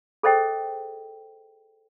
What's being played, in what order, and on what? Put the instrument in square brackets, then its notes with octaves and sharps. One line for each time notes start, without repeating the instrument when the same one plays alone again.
[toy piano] G#4 A4 C5 D#5 G5